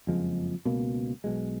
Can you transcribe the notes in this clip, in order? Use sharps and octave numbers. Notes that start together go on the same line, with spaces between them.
F#1 F2 F3 G#3
C#2 B2 A#3
B1 B2 G#3